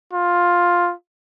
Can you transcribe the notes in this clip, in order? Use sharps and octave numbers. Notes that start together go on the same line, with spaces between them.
F4